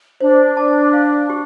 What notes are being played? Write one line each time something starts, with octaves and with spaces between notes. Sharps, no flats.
D4 C5
A5
F5
G4